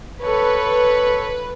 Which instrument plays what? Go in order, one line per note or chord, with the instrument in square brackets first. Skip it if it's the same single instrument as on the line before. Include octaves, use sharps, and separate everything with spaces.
[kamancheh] A4 C#5 [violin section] B4